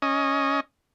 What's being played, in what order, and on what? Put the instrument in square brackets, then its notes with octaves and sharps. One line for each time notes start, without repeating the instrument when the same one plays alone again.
[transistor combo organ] C#4 D#5